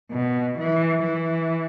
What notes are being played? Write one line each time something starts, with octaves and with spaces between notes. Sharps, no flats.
B2
E3
E3